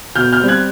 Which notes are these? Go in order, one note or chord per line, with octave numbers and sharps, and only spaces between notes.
B2 F6 G6
F6 G6
G3 C4
F#6 G#6